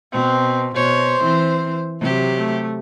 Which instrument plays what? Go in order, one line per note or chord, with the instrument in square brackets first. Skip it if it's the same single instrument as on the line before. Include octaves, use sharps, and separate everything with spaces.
[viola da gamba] B2 [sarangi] C4
[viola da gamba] B2 C#5 [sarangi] C5
[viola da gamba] E3 C4
C3 F#3 G4
[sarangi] A3